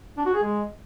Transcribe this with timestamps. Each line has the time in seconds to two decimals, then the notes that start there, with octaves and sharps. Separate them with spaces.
0.17 D4
0.26 F#4
0.34 G#4
0.42 G#3